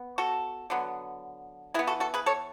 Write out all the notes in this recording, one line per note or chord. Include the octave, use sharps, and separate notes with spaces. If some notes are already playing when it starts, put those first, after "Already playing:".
Already playing: B3
F#4 A4
D3 F#3 B3
E3 B3 E4 G#4
F#4 A4
F#4 A4
G#4 B4
A4 C#5